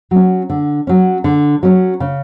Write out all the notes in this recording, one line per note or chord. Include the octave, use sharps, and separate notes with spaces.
F#3 C#4
D3
F#3 C#4
D3
F#3 C#4
C#3